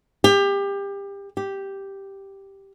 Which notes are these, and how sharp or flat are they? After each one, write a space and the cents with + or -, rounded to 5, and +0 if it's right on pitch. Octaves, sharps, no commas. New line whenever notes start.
G4 +25
G4 +0